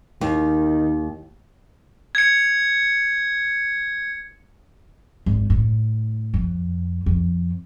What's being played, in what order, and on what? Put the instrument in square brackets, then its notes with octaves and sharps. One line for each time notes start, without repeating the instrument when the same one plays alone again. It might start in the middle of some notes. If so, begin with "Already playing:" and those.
[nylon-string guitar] D#2 [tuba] D#3
[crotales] G#6 C#7
[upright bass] G#1
A2
F2
F2